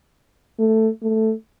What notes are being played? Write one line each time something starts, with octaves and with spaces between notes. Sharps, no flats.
A3
A3